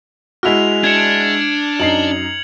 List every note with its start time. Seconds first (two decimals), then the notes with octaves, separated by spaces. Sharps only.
0.43 G#3 E4 F#4 F6 F7
0.84 D4 G#6 C#7
1.80 F#2 D#4 C7 F#7